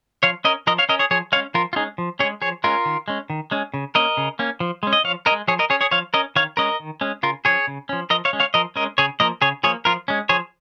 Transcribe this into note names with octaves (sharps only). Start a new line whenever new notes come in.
F3 C#5 F5
C#4 A#4 D#5
F3 A#4 D#5
C#5 F5
C#4 A#4 D#5
G#4 C#5
F3 G#4 C#5
G#3 C#4 C#5 F5
F3 F4 A#4
F4
G#3 C#4 D#4 G#4
F3
G#3 C#4 G#4 C#5
F3 G#4 C#5
G#3 C#4 F4 A#4
D#3
G#3 C#4
D#3
G#3 C#4
C#3
A#3 C#4 A#4 D#5
C#3
A#3 C#4
F3
G#3 C#4
D#5
F3 C#5 F5
C#4 A#4 D#5
G#3
F3 G#4 C#5
A#4 D#5
C#4 G#4 C#5
G#4 C#5
F3 C#5 F5
C#4 A#4 D#5
D#3 C#5 F5
G#3 C#4 A#4 D#5
D#3
G#3 C#4
C#3 F4 A#4
F3 C#4 G#4 C#5
C#3
F3 C#4
F3 A#4 D#5
C#5 F5
G#3 C#4
C#5 F5
F3 A#4 D#5
G#3 C#4 A#4 D#5
C#3 G#4 C#5
F3 A#3 A#4 D#5
C#3 G#4 C#5
F3 A#3 G#4 C#5
F3 F4 A#4
G#3 C#4
F3 G#4 C#5